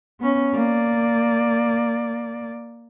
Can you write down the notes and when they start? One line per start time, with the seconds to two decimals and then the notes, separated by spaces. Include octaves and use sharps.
0.20 B3 C#4
0.53 A#3 D5